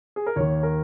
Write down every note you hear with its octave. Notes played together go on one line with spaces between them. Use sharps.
G#4
A#4
D#2 D#3 C#5
A#4